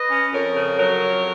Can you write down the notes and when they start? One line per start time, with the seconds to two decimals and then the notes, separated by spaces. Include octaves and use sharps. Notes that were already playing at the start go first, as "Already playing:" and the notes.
Already playing: B4 D#5
0.08 C#4
0.32 F2 A#4 C#5
0.55 C#3
0.78 F#3 A#4 C#5
1.02 F2